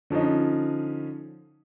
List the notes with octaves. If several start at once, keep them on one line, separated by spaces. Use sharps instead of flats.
D3 F3 C#4 D#4